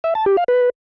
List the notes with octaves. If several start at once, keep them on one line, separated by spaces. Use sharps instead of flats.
E5
A5
G4
F5
B4